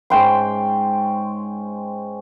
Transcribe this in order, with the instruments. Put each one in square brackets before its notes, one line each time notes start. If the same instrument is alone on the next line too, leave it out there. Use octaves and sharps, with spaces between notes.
[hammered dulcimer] G#2 C#4 G5 C6